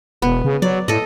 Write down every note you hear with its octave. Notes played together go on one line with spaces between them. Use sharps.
E1 B3
C#3
F#3 D5
A2 A4 D#5